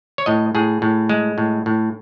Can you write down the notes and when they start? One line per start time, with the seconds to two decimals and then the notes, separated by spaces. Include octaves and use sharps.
0.18 C#5
0.26 A2 D#5
0.55 A2 G#4
0.82 A2
1.09 G#3
1.38 A2
1.66 A2